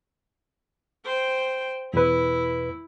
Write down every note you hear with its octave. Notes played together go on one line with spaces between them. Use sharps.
C5 G5
E2 B2 E4 B4